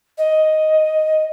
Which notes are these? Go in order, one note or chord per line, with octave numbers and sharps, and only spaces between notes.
D#5